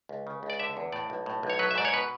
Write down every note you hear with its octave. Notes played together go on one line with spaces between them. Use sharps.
C#2
C#3
C#2
D5
D3 E5
E2
A2 D5
B1
A2
B1
C#5
F#3 B4
E5
G#2 D5
C#5
B2 B4